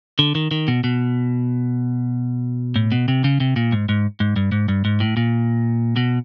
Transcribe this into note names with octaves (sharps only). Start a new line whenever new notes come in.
D3
D#3
D#3
B2
B2
A2
B2
C3
C#3
C3
A#2
G#2
G#2
G#2
G2
G#2
G2
G#2
A2
A#2
B2